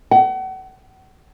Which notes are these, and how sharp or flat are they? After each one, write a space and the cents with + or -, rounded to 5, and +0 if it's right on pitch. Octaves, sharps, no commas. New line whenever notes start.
F#5 +35